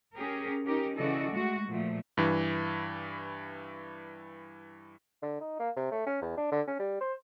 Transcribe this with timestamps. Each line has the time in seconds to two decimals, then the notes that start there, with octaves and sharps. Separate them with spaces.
0.16 C#4 G4 G#4 A#4
0.66 C#4 D#4 G4 A#4
0.97 C#3 E3 F#4 A4 D5 D#5
1.29 G#3 A3 F#4
1.69 A#2 F3 A3
2.17 G2 E3
5.23 D3
5.40 D#4
5.59 A#3
5.76 C3
5.92 A3
6.06 C#4
6.22 E2
6.37 D4
6.52 D3
6.67 C#4
6.80 G3
7.01 C5